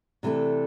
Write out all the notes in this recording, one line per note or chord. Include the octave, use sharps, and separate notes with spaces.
C3 E3 A3 D4 A4